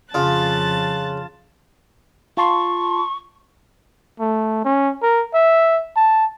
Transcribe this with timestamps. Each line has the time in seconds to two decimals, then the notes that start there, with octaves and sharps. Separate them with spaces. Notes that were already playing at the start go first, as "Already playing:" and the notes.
0.14 F2 C#3 F4 A5 F#6 A6
2.37 F4 A5 C6 C#6
4.20 A3
4.65 C#4
5.02 A#4
5.34 E5
5.97 A5